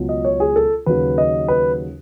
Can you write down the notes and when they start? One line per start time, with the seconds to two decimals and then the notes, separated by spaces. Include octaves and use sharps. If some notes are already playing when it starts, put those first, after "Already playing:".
Already playing: C#2 B2 F#3
0.09 D#5
0.25 C#5
0.40 G#4
0.56 A4
0.86 D#2 C#3 F#3 B4
1.18 D#5
1.48 B4